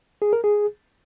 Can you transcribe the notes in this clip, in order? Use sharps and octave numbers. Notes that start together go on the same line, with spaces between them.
G#4
A#4
G#4